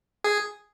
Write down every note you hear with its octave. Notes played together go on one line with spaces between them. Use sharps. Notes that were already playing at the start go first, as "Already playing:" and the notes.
G#4